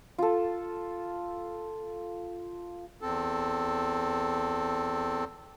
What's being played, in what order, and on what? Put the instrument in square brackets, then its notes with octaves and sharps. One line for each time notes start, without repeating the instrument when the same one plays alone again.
[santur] F4 A4
[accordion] E2 C4 A4